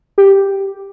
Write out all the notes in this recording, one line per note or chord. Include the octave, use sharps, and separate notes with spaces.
G4